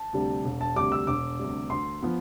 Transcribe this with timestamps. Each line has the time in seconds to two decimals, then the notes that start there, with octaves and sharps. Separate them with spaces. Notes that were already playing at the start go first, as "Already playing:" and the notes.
Already playing: A5
0.13 D2 C3 G3
0.45 E1
0.61 A5
0.76 D2 C3 G3 D6
0.92 E6
1.07 E1 D6
1.39 D2 C3 G3
1.70 D2 C6
2.02 F3 B3